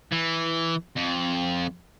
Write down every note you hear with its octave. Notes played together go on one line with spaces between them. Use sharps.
E3
F2